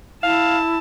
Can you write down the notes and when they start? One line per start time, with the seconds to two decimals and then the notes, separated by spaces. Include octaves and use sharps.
0.23 E4 F5 A5